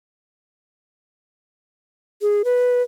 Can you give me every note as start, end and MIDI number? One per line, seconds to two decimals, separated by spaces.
2.22 2.42 68
2.45 2.82 71